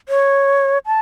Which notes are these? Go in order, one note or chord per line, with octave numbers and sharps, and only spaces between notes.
C#5
A5